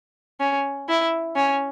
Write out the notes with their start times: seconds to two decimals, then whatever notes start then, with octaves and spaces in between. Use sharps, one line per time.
0.40 C#4
0.89 E4
1.36 C#4